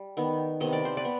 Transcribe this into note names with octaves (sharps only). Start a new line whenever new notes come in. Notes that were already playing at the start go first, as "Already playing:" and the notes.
Already playing: G3
D#3 B3
C3 D#3 B3 D#5
D5
C5
B4 D5
B3